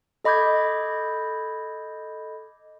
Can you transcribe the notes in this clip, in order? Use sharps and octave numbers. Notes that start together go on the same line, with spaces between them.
A4 D#5 B5 D6 G6 G#6